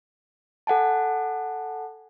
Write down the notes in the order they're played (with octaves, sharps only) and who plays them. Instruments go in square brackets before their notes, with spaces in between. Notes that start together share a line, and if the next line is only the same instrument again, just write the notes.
[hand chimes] A4 F#5 G#5 A5